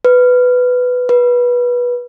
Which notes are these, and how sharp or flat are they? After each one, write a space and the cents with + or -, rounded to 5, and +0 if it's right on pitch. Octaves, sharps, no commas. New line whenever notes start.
B4 +10
B4 -20